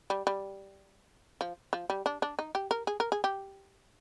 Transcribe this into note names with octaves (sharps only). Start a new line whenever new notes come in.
G3
G3
F3
F3
G3
D4
D4
D#4
G4
A#4
G#4
A#4
G#4
G4